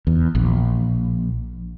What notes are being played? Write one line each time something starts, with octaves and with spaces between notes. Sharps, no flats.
E2
A#1